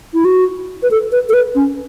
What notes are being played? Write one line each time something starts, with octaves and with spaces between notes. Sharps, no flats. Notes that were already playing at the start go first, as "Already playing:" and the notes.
E4
F#4
B4
A4
B4
A4
B4
C#4